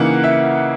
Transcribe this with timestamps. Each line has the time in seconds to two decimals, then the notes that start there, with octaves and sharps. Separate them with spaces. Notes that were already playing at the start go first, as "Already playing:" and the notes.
Already playing: C#3 E3 A#3 D#4 F#5
0.24 E5